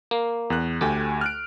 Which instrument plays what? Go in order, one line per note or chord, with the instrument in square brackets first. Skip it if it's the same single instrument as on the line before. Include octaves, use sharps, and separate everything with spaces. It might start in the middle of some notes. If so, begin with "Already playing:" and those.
[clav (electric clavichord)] A#3
[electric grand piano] E2 F#6
[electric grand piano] D2 A3 G#5 [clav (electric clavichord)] G4
[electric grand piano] F6 F#6 D7